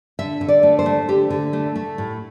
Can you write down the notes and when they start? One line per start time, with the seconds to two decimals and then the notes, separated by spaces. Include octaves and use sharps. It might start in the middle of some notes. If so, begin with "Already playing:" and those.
0.19 D3 E5
0.41 D3
0.48 D5
0.63 A3
0.79 C5
0.86 A3
1.08 D3 G4
1.30 D3
1.53 A3
1.76 A3
1.98 A2